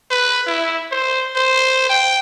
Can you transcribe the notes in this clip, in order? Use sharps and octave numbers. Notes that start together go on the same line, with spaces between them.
B4
E4
C5
C5
G5